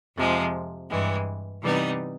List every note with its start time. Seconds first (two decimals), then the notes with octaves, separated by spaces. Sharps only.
0.16 F2 C3 F3 G#3
0.89 G2 E3 G#3
1.63 C3 E3 G3 B3 D#4